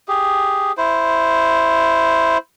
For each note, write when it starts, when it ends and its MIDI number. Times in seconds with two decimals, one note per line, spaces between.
0.08 0.72 67
0.08 0.72 68
0.77 2.38 64
0.77 2.38 72